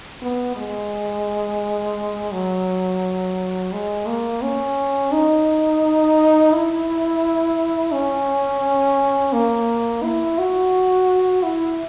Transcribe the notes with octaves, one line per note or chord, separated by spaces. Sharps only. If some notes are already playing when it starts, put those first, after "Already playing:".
B3
G#3
F#3
G#3
A#3
C#4
D#4
E4
C#4
A#3
E4
F#4
E4